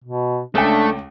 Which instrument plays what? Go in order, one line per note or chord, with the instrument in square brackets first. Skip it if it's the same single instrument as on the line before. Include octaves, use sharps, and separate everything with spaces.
[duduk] B2
[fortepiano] C#2 G5 [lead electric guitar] A3 [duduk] D4